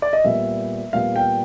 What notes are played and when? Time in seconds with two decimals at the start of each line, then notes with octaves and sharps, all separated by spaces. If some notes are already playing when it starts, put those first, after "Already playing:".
0.02 D5
0.13 D#5
0.24 A#2 G3 B3 E5
0.93 A#2 G3 B3 F5
1.16 G5